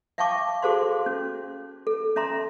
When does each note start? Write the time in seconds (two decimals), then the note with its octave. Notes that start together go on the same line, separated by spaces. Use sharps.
0.18 E5 F5 G5 A5 C#6 D6
0.62 F#4 G#4 A4 C5 F5 C6
1.06 C#4
1.87 A4
2.16 C#4 E5 A#5 C6